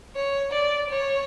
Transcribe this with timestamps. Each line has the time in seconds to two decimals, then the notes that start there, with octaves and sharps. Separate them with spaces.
0.16 C#5
0.52 D5
0.90 C#5